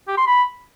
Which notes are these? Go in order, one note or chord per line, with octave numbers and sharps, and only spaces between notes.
G4
C6
B5